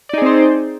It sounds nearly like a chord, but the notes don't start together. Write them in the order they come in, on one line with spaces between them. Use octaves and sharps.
D5 D#4 G#4 C4 C5